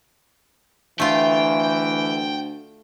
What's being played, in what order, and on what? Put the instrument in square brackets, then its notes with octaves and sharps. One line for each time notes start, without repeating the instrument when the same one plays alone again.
[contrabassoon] D2 [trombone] E3 [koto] A3 F4 [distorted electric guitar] G5